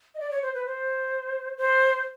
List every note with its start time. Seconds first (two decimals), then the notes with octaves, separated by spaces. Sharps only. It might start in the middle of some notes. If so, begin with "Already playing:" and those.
0.15 D#5
0.20 D5
0.31 C#5
0.42 C5
0.54 B4
0.66 C5
1.57 C5